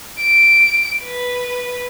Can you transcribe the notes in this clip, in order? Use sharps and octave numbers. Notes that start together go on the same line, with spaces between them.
D7
B4